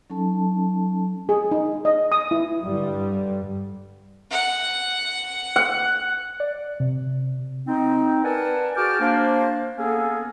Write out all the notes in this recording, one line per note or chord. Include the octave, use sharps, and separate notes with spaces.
F#3 C#4 D#4 A4 A5
G#4
D#4
D#5
D#6
E4
G2 D3 G3
F#5
F#5
D5
C3
C4 D#4
A#4 B4 D5 F#5 G#5 A5
F#4 G#4 G5 A5 D6 F6
A#3 D4 C5
A#3 B3 C#4 G#4 A4